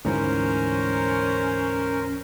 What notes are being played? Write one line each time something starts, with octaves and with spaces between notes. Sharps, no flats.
D2 G#2 E3 C#4 A#4 C5